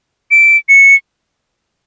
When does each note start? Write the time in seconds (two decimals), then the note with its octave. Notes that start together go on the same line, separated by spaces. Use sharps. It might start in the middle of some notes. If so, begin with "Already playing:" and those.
0.31 D7
0.69 C#7